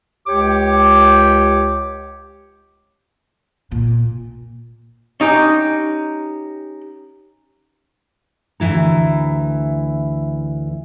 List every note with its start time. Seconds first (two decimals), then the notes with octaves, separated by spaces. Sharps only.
0.27 C#2 G4 C#5 D6
3.71 A#2
5.20 C#4 D#4 G4
8.60 D2 G#2 E3 E4 A#5